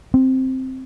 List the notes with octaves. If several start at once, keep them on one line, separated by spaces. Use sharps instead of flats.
C4